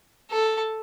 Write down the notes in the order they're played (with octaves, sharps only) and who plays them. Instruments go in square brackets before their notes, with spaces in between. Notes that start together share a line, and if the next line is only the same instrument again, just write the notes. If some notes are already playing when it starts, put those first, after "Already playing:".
[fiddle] A4